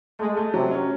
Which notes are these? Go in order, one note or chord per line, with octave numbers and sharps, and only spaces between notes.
G#3 A3
A3
C3 F#3
C#4